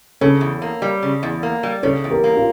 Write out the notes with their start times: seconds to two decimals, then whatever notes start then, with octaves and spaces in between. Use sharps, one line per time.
0.21 C#3 A4 C#5
0.41 E2
0.62 A#3
0.82 G3
1.03 C#3
1.23 E2
1.43 A#3
1.63 G3
1.83 C#3 A4 C#5
2.04 E2
2.11 G4 A#4
2.24 A#3
2.37 F4